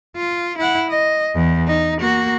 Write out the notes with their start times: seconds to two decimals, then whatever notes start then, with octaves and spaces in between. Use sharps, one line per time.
0.16 F4
0.58 E4 F#5
0.90 D#5
1.34 E2
1.67 D#4
2.00 A#3 F#4